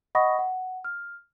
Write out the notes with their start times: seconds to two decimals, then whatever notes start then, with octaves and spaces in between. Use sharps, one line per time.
0.15 D#5 F#5 B5 C#6 D#6 A#6
0.39 F#5
0.85 F6